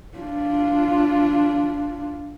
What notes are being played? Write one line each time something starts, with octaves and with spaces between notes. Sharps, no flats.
D4 F4